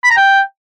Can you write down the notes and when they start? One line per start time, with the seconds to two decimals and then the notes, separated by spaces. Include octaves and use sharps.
0.04 B5
0.10 A#5
0.17 G5